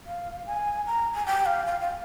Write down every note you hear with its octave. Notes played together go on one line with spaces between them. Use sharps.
F5
G#5
A#5
G#5
G5
F5
F5
F5